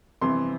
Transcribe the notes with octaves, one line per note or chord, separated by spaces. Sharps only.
G1 F2 C3 E3 C6